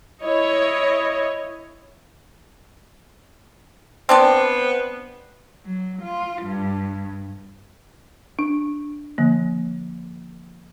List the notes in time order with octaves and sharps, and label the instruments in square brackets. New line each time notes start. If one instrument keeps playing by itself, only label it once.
[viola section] E4 C#5 D#5
[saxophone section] B3 C5 [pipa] C4 D4 D5
[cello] F#3
F4
G2
[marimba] D4
D3 F3 A#3